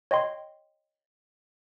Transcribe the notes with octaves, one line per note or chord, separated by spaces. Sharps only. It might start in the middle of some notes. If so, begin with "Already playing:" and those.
C#5 D#5 G5 C6